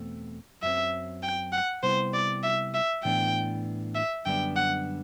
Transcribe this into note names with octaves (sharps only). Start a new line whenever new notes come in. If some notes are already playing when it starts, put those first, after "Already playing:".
Already playing: E2 B2 A3 C4
F#2 F#3 C4 E5
G5
F#5
C3 G3 B3 E4 C5
D5
E5
E5
A2 E3 B3 D4 G5
E5
F#2 D3 G3 B3 D4 G5
F#5